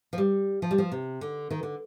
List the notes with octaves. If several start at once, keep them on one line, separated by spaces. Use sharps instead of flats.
F3
G3
F3
G3
F3
C3
D3
D#3
D3